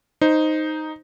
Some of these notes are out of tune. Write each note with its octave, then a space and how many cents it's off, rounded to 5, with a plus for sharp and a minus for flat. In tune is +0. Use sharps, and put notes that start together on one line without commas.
D#4 +0 C5 +0